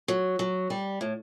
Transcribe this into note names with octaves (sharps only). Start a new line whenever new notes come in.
F#3
F#3
G3
A2